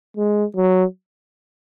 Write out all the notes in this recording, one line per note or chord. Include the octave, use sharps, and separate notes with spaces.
G#3
F#3